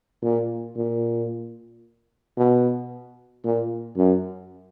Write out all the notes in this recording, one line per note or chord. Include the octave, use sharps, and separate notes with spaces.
A#2
A#2
B2
A#2
F#2